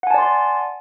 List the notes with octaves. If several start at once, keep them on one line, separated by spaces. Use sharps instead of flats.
D5 F#5 G#5 A5 C6